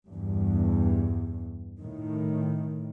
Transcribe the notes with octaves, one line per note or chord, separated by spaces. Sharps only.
E2 G2
A2 D#3